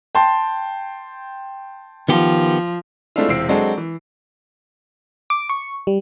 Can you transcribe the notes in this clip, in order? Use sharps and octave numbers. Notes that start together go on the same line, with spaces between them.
G5 A5 C6
D#3 F3 B3 G4
G#3 A3 C4 D4 E4 F4
E1 C3 C4 E6 C7 D7
F#3 G#3 C4 D4 A4
E3
D6
C#6
G3